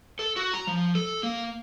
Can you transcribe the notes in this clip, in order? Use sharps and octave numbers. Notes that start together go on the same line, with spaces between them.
A4
F#4
A#5
F3
A4
A#3